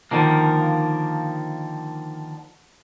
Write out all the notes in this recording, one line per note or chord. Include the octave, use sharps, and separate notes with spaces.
D3 D#3 F3 A#3